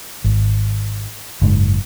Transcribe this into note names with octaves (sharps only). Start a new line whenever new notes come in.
G#1
F#1 G#2